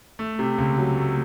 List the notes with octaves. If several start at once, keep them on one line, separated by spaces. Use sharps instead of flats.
A3
C3
C#2
F#3
A3